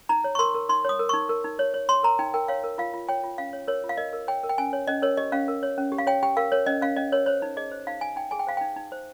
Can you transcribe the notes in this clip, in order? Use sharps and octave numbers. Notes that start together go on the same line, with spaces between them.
D#4 A#5
C#5
C#6
A#4 C6
A#4
D#4 C6
C#5 D#6
A#4
D#4 C#6
A#4
D#4
C#5
C#5
C#5 C6
A#4 A#5
D#4 G5
A#4 G5
C#5 F5
A#4
F4 F5
F4
C#5 G5
F4
C#4 F5
C#5
A#4 C#5
F4
F5
A#4 D#5
A#4
C#5 G5
A#4
G5
C#4 G#5
C#5
C#4 D#5
A#4 C#5
G4 D#5
C#4 F5
A#4
C#5
C#4
G4
F5
C#5 G5
G4 G5
A#4 F5
A#4 C#5
C#4 D#5
C#4 F5
C#4 D#5
A#4 C#5
C5 C#5
D#4
G#4 D#5
C5
D#4 F5
D#4 G#5
D#4 G5
G#4 G#5
G5
C5 F5
D#4 G5
D#4
C5